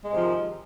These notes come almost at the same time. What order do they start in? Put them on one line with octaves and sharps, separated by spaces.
G#3 G#2 C3 F3 D#3